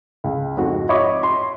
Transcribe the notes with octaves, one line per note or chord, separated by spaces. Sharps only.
C#2
F2 G#2 F#4
C#5 D#5 E5 B5 C#6 D6
C6